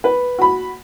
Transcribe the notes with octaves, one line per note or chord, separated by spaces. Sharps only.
B4
F#4 B5